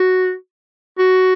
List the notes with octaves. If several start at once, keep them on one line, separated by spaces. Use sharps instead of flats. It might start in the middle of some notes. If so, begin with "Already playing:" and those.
Already playing: F#4
F#4